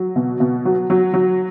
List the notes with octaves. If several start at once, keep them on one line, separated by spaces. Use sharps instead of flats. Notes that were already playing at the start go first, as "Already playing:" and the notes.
Already playing: F#3
B2
B2
F#3
F#3
F#3